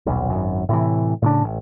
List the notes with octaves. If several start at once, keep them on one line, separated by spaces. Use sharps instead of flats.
D#1 B1
G#1 F#2
A2 C3 E3
A2 C#3 D4
A1